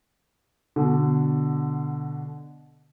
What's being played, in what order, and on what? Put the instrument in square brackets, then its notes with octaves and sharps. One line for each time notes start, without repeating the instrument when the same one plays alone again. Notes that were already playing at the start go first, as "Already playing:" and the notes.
[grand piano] B2 D3